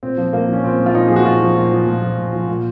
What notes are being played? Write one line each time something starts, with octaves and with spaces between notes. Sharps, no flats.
A#2 C4
F3
A#2 A#3
F3 C#4
A#2 C4
F3
F4
A#2 D#4
F3 G#4
F#4
A#2 F4
F3
A#2
F3
A#2
F3
A#2
F3
A#2